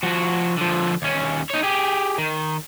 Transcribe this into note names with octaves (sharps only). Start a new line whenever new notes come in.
F3 F#4
D3 F3
D#2 C#4
D#4 C#5
G4 G#4
D#3